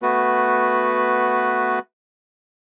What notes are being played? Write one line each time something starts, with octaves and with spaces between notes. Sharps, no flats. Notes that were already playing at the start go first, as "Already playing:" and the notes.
A3 B3 F#4 B4